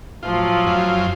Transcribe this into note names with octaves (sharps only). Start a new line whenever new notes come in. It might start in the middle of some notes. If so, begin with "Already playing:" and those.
A2 F3 F#3 F4
F#2 F4